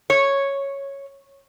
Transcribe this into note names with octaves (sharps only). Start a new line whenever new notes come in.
C#5